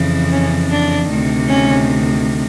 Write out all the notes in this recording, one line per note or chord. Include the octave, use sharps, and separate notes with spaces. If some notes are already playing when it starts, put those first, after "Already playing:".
Already playing: F2 C#3 E3
C#4
D4
D2 C3 D#3
C#4